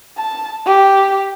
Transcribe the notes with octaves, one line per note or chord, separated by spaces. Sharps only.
A5
G4